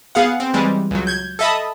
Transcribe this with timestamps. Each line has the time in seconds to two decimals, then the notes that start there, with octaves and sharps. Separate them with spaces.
0.15 B3 G#4 F5 F#5
0.40 C4
0.54 E3 G3 G#3
0.91 C#2 F#3
1.07 G6 G#6
1.39 A4 D#5 E5 A5 B5 D#6